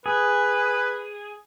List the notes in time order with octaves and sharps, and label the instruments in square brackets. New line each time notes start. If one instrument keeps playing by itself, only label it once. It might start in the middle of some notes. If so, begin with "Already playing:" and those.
[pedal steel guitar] G#4 [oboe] B4